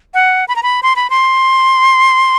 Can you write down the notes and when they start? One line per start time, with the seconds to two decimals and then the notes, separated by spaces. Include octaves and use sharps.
0.14 F#5
0.48 B5
0.56 A#5
0.63 B5
0.83 C6
0.96 B5
1.10 C6